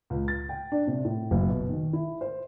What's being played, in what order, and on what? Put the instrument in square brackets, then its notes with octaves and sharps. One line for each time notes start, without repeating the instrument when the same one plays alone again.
[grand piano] C#2
A6
G5
D4
C3
A2
F#1
B2
D#3
E4
C5